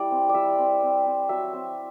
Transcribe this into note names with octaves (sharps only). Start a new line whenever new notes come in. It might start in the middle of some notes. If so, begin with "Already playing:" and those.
Already playing: G3 E4 D5
C4
D5
G3 E5
C4
C4
C4
F#3 E5
C4